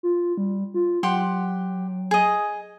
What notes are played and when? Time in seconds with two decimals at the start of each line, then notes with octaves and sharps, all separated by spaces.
0.03 F4
0.37 G3
0.74 F4
1.03 F#3 G4 F#5 C6
2.11 G#4 D#5